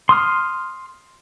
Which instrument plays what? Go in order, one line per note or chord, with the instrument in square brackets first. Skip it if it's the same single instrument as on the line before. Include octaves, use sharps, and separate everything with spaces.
[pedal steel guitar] C6 D#6 F6